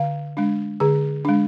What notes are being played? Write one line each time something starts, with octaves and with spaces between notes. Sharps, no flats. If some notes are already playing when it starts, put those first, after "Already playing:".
Already playing: D3 F5
G#3 D4
D3 G#4
G#3 D4